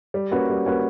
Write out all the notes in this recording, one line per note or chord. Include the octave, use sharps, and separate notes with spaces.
G3
A#3 C#4 F#4 B4
G3
A#3 C#4 F#4 B4